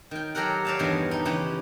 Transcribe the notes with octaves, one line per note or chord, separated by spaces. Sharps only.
D#3 G5
F#3 G4 A4 A#4 F#5
C#5 D5 E5 F5 G5 A5
E2 G2 B2 D#3 E4
D#4 G4
C#3 E3 C#4 E4 G4